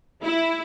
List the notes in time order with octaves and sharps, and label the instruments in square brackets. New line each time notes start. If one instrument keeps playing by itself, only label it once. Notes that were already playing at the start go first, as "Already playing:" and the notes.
[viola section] E4